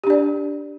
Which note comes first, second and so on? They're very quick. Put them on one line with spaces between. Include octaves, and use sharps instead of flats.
G4 D4 D5